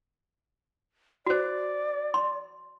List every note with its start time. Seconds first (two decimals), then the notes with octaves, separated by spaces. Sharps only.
1.26 F#4 C5 D5
2.14 C6